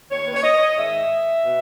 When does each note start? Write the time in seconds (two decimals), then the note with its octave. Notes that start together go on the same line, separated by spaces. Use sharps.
0.11 D#2 D#3 C#5
0.25 B4
0.34 C#5
0.43 D#5
0.76 G#2 D#3 E5
1.46 B2